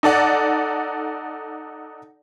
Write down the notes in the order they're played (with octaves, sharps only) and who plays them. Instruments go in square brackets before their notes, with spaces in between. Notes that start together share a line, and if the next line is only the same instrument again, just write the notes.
[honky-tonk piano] D#4 A4 D5 F#5